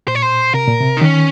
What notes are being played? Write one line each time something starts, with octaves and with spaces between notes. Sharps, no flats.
A#2 C5
C#5
C5
C3 A#4
A#2
C3
D#4
D#3 C#4